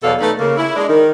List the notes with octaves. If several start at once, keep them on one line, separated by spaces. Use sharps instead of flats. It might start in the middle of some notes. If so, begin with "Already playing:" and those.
E2 B2 F#3 A4 D5 F5
A3 D#4 A4 B4
C#3 A#3
E4
G#3 D4 D#5
D#3